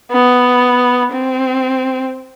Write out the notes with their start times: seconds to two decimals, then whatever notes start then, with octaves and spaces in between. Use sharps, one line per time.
0.12 B3
1.13 C4